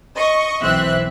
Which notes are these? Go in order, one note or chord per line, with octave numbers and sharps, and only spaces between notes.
D#5 C#6
B1 E3 C4 E5 F#6